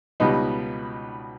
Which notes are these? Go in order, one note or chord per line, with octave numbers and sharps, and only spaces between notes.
C#2 B2 G3 B3 D#4